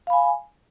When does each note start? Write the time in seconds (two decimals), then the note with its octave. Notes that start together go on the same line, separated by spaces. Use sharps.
0.07 F5
0.10 B5
0.13 G#5